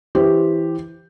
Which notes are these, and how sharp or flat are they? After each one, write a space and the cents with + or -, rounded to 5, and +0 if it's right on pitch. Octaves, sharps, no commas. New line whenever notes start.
E3 +0 G4 +0 C5 +0